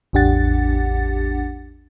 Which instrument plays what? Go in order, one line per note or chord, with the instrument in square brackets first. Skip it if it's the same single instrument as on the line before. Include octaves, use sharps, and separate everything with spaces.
[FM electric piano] A1 E2 D4 G4 F#5 A6